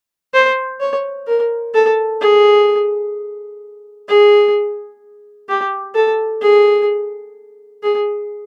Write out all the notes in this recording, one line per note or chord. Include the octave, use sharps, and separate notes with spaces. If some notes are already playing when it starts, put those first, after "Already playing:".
C5
C#5
A#4
A4
G#4
G#4
G4
A4
G#4
G#4